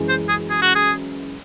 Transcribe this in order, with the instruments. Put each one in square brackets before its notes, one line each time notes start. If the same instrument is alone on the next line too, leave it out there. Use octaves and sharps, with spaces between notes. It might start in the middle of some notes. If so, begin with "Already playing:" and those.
Already playing: [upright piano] F#2 E3 G#3
[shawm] C5
G#4
G#4
F#4
G#4